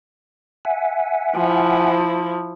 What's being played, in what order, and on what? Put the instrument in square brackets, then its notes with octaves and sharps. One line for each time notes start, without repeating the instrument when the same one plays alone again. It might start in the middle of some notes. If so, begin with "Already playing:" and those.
[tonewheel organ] E5 F#5 G#5
[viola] F3 E4